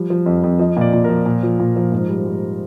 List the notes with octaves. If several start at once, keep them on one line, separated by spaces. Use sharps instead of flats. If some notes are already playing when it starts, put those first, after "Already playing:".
Already playing: F3 G3
F3
F2
F2
F3 D#5
A#2 D5
A#2
F3 A#4
A#2
F3
A#2
F3
G#2
G3
G3